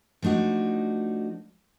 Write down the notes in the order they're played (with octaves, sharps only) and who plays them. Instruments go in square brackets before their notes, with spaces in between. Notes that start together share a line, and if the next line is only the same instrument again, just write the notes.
[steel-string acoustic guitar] F3 A3 D4 D#4 F#4